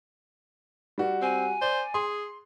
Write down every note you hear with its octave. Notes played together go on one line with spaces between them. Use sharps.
G3 F#4
C4 G#5
C5 D5
G#4 C6